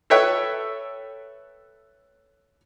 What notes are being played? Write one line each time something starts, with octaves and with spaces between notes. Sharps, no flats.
A4 B4 C#5 E5 G5